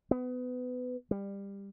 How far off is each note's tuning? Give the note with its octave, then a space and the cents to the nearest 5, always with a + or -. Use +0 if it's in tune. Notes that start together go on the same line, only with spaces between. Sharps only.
B3 +25
G3 +20